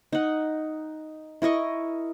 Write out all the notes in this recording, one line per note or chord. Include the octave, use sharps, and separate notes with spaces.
D#4 F#5
E4 A#4 D#5 C#6